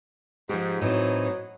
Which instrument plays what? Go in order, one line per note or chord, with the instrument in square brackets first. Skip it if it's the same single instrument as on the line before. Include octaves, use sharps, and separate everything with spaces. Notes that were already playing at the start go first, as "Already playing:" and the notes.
[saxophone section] G#2 [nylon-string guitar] F3 G4
[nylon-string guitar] A2 C4 C5 [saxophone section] E3 D#4 [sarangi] F#3